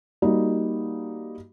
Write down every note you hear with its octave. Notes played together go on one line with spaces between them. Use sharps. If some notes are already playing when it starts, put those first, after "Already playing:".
G3 A#3 D#4 F#4